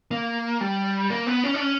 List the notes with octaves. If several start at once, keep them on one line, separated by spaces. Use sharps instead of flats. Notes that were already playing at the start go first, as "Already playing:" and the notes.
A#3
G3
A#3
B3
C#4
D4
C#4